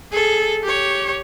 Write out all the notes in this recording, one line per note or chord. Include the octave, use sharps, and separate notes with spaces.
G#4 A4
G4 C#5